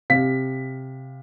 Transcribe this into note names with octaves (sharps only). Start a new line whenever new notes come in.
C3 F5 B6